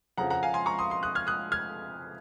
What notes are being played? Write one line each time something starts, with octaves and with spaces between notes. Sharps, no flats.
F2 C#3 F3 F#5 A#5
F#5 A#5
F5 G#5
G#5 C6
A#5 C#6
C6 D#6
C6 D#6
D#6 F#6
F6 G#6
D#6 F#6
F6 G#6